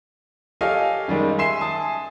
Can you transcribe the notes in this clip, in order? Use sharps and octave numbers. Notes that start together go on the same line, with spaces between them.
G4 A4 C#5 D#5 F5 G#5
F#2 D#3 G3 G#3
E5 G#5 C6 C7 E7
G#5 A5 D#6